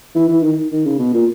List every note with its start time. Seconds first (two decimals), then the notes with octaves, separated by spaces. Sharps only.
0.15 E3
0.29 E3
0.43 D#3
0.72 D#3
0.85 C#3
0.99 B2
1.14 A#2